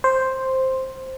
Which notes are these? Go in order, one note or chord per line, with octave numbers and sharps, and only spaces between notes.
C5